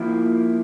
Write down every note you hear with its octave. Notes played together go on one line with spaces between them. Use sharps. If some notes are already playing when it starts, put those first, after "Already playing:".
Already playing: F3 A#3 E4